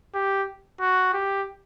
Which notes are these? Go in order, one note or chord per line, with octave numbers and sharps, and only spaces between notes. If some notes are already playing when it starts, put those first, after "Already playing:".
G4
F#4
G4